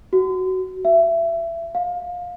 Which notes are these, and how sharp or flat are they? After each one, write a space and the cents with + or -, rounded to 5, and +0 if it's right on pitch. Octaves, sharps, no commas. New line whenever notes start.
F#4 +15
E5 +25
F5 +25